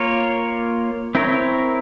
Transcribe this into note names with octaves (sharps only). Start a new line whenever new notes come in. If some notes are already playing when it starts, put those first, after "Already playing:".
Already playing: A#3 F4 A#4 C#5
C4 E4 A#4 C#5